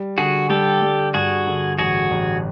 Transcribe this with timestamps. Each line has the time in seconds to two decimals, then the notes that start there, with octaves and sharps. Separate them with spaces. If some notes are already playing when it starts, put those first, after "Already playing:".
Already playing: G3
0.18 D3 F#4 G#4
0.50 G3 G4 A4
0.82 G3
1.14 G2 F#4 G#4
1.47 D3
1.79 A1 F#4 G#4
2.11 A1